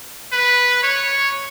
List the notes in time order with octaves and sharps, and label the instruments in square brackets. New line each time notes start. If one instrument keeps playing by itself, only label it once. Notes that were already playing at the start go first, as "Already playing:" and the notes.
[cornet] B4
C#5